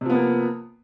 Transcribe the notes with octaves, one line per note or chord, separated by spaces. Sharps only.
C3 F3 A#3 B3